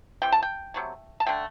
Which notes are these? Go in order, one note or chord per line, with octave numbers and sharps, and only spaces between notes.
C3 E3 G5
A5
G5
C3 F#3 A3
A5
D3 A3 G5